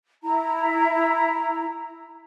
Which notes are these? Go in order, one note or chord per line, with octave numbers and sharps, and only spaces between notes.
E4 A#5